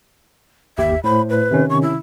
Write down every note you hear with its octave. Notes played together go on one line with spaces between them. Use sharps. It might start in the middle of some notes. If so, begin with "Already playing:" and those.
G1 D#2 G4 E5
A2 C5 B5
B4
C3 D#3 C#4
C#6
E4